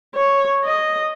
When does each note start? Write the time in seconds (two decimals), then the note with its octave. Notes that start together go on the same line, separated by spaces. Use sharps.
0.15 C#5
0.65 D#5